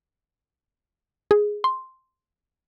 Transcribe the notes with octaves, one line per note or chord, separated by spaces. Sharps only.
G#4
C6